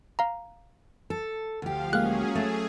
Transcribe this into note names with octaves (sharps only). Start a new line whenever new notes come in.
F5 A#5
A4
D2 F3 G4 F5
F#3 G#3 A#3 C#4 G#4 F5 F#6
A3 G#4